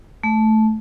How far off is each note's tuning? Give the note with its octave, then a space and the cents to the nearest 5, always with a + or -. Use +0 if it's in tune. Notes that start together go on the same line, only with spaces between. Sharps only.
A3 -10